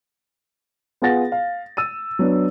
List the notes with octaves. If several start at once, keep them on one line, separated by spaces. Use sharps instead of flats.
B3 F4 G#4 F#5 A6 A#6
F5
E6 A6 D#7
F#3 B3 D4